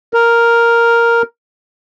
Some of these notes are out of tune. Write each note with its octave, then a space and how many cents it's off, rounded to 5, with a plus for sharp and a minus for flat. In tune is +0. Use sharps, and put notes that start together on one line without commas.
A#4 +0